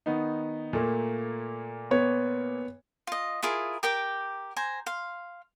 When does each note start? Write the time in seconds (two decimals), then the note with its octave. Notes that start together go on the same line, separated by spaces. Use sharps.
0.06 D#3 B3 D#4
0.73 A#2 A3 A#3
1.91 B3 C#5
3.07 F4 D#5
3.42 E4 F4 G#4 A#4
3.83 G4 A#4 G5 D6
4.56 C5 G#5 A#5
4.86 F5 C6